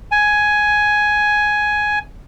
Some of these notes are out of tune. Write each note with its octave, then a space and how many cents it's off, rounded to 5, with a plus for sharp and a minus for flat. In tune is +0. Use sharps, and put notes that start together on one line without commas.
G#5 +10